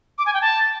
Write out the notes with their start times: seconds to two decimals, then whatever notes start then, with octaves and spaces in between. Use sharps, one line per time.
0.18 D6
0.26 G#5
0.34 G5
0.41 A5